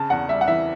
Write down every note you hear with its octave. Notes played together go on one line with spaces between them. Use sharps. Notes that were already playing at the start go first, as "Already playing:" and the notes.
Already playing: C#3 A5
E2 F#5
G3 E5
F#5
E3 E5